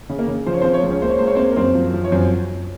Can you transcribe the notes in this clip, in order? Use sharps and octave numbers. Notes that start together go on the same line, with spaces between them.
C#3
A#3 A#4
C#3
F3 C5
C#5
C4 C5
F3
C#5
C#2
C#4 C#5
A#3 C5
C#5
C#2 C5
C#5
A#3 C4 C5
A#4
F#2 C4 C5
F3
F3
C#5
F#2 C4 C5